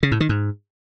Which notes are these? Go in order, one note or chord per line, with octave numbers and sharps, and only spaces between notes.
C#3
A2
D#3
G#2